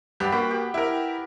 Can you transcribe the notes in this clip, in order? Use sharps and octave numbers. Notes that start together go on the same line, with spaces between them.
G2 B3 G4
A#3 F#4 G5 B5
G4
E4 A#4